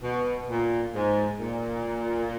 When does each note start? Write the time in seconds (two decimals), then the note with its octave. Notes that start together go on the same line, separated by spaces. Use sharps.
0.02 B2
0.48 A#2
0.94 G#2
1.39 A#2